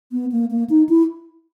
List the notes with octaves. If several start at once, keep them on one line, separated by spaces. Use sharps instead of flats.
B3
A#3
A#3
D#4
E4